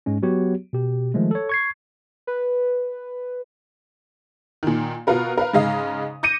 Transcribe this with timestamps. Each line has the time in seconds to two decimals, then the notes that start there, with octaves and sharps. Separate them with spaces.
0.06 G#2 G#3 C#4
0.22 F#3 B3 F#4 G4 C#5
0.73 B2 G4
1.14 D#3 F3 G#3 A3
1.31 A4 C#5
1.49 C#6 G#6 C7
2.27 B4
4.63 A#2 D#3
5.07 B2 F4 F#4 A#4 B4
5.38 A#4 B4 F5
5.53 G#2 C#3 G#3 D#5 F5 D#6
6.23 D6 G6 A#6 C#7 D#7